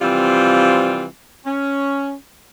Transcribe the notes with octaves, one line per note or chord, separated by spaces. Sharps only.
C3 E3 F3 G3 C4 F4
C#4